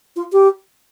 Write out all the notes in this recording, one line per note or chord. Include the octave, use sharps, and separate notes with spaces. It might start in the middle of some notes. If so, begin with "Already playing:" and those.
F4
G4